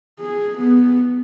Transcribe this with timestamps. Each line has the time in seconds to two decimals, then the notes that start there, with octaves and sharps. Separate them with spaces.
0.20 G#4
0.58 B3